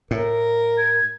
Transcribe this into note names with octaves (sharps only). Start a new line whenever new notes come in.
A2 A#4
G#6